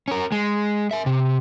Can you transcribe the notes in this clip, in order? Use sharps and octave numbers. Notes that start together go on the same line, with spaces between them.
C#4 A#4
G#3
A#4 E5
C3